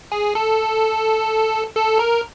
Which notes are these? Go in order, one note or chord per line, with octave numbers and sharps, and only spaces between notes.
G#4
A4
A4
A#4